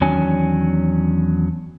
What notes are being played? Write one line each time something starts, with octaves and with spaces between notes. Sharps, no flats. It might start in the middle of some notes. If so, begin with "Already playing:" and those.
E2 D#3 F#3 C#4 D4 G#5